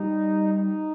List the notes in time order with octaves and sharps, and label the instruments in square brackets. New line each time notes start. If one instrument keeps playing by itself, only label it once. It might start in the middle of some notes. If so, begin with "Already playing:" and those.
Already playing: [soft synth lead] G3 [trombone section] D#4
[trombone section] D#4